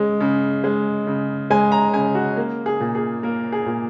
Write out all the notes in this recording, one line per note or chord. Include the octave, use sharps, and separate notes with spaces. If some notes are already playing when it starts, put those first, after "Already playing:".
Already playing: C#3 G#3
C#3
G#3
C#3
G#3 G#5
A#5
C#3 G#5
F#4
A#3
G#4
A#2
G#4
A#3 A#4
G#4
A#2